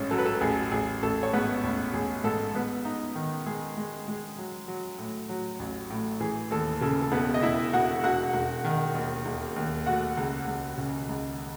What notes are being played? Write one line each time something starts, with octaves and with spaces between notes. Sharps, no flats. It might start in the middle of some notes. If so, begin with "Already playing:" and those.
Already playing: A1 G#2 C#4
F#3 A4
B4
A4
A1 G#4
A1 G#4
A1 A4
C#5
G#2 B3 B4
A1
A1 G#4
G#2 A4
G#2 B3 B4
D#4
D#3
G#3 G#4
G#3
G#3
F#3
F#3
A2
F#3
A1
A2
E3 G#4
D#2 A4
C#3 A4
A4
E1 B3 B4
D#5
E1 E4 E5
E1 F#4 F#5
E1 F#4 F#5
E1
D#3
D#2
E1
D#2
A3 F#4 F#5
C#2
C#2
C#3
C#2